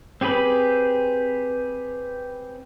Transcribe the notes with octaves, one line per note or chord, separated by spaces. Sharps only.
C4 G4 G#4 B4 B5